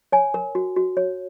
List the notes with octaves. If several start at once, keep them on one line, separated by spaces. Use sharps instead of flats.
C#5 G#5
A#4
F#4
F#4
C#5